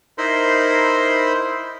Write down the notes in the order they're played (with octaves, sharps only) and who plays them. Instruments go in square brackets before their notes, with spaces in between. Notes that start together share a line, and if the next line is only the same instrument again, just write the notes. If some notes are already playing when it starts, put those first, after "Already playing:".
[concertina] D#4 E4 A#4 C5 B5 C6